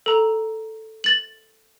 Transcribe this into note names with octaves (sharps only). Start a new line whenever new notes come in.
A4 A#5
A6 F#7